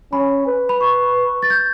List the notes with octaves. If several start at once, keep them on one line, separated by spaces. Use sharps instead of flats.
C#4 B5
B4
B5
C#6
A6
G6